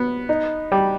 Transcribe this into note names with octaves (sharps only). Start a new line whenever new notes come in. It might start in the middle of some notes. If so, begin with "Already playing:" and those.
Already playing: B3
D#4
G3